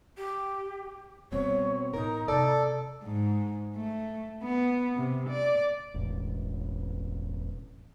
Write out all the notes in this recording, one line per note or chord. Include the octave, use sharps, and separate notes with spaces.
G4
B2 G3 C4 C#4 C#5
A1 D#4 A#4
C3 A4 D5
G#2
A3
B3
C3
D5
E1 A1